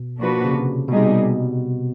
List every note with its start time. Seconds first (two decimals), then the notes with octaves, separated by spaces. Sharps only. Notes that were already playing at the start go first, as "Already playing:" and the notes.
Already playing: B2
0.19 F3 A#3 D4 F#4 B4
0.45 C#3
0.53 C3
0.88 B2 G3 A#3 D#4 G#4
0.97 C3
1.05 B2